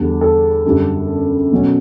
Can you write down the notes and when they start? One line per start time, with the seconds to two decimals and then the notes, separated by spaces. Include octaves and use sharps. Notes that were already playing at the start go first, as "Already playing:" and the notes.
Already playing: E2 D3 G3 D4
0.21 A4
0.65 F#2 D3 G3 D4
1.52 B2 F#3 C#4